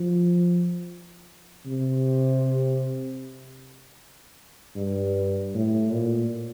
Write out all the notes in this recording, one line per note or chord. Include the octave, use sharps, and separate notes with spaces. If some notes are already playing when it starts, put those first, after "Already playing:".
Already playing: F3
C3
G2
A2
A#2